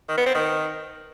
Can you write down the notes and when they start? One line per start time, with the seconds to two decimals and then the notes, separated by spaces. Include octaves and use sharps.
0.09 D#3
0.17 B3
0.26 C4
0.35 D#3